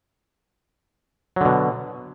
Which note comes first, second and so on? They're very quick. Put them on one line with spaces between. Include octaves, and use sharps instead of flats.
F#3 D3 B2